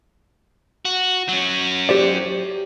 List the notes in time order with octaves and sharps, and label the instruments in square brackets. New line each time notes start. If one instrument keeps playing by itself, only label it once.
[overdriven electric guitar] F#4
F#3 C#4
[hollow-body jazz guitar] G4 C5 D5